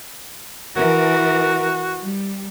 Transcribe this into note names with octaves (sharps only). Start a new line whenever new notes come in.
E3 F#4 A#4
G3